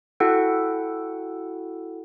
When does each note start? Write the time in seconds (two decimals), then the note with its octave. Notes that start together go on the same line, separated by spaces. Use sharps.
0.20 E4 F#4 A4 F#5 G5